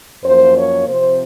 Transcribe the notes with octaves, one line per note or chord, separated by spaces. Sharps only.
F#2 F3 A#3 C5
C#5
C3 F3 C4 C5